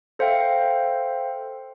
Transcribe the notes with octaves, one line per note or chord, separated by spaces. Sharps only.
A4 C5 E5 F5 G5